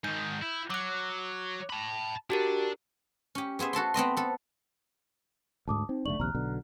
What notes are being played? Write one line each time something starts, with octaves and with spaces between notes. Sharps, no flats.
G#2 D#3 G6
E4
F#3 D6 F#6
A5 B5
D4 F#4 G4 A#4
C#4 G4
B3 G#4 C5 E5
F#4 A4 A5 C6
B3 C4 D#5 C6
B3 A4
D2 G#2 A5 D6 D#6
C4 D#4
F1 D3 A3 D5 C#6 F#7
A#1 D#2 C3 A#5 F6 F#6
B1 B2 D3